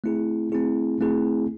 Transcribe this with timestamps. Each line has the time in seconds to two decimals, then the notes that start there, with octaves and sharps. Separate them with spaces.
0.04 A3 C4 E4 G#4
0.52 A3 C4 E4 G#4
1.01 A3 C4 E4 G#4